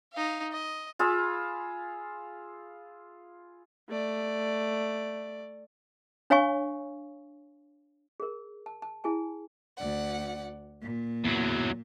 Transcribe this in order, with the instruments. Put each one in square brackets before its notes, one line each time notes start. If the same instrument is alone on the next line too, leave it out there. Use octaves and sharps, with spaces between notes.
[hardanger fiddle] D#4 F5
D#5
[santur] F4 G#4 E5 B5
[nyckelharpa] A3 D5
[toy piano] D4 C#5 F5 G#5 C#6
G#4 A#4
A5
A5
E4 G#4 G#5 A5
[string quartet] D2 D5 F#5
A#2
[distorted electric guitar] E2 F#3